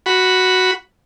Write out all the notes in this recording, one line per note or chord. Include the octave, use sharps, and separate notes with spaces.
F#4 B5